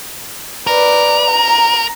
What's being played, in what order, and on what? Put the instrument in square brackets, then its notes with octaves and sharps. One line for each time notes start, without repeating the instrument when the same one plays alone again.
[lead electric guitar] A#4 [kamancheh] B4 D5
[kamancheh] A#5